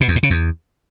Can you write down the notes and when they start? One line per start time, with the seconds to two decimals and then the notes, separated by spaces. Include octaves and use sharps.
0.01 B2
0.08 E2
0.16 A2
0.23 C#3
0.30 E2